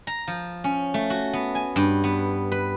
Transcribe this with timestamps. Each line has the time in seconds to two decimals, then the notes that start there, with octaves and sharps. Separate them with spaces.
0.07 A#5
0.27 F3
0.64 C#4
0.94 A3
1.10 F#4
1.33 B3
1.55 G#5
1.76 G2
2.04 B3
2.52 B4